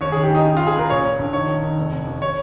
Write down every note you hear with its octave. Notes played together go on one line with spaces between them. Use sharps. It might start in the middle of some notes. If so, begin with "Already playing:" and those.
D#2 C#5
D#3 G#4
G4
D#2 D#4
C#3
C#2 F4
G#4
C#2 A#4
A#2 C#5
A#2
A#1
D#3 C#5
D#3
D#3
F1
F1
D#2
C#5